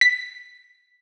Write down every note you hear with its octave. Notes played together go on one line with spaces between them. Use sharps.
B6